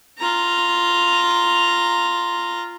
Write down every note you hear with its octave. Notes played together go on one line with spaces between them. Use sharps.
F4 A#5